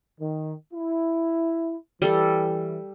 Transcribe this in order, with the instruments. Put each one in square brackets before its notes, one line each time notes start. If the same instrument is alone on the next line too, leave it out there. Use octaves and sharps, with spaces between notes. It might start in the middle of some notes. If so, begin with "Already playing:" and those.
[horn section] D#3
E4
[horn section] E3 [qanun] G3 A4